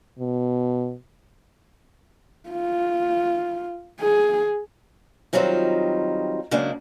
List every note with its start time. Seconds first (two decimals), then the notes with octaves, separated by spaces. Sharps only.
0.19 B2
2.49 F4
4.00 G#4
5.33 D#3 F#3 G3 C4 D#4 F4
6.51 C#3 F#3 G#3 A#3 D4